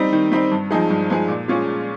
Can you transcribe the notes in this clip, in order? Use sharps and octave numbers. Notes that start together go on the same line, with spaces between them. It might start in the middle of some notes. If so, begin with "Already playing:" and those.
Already playing: G3 C4 D#4
D#3
G3 C4 D#4
G2
F3 G#3 D#4 G#4
G2
F3 G#3 D#4 G#4
A#2
G#3 C#4 F4 G#4
A#2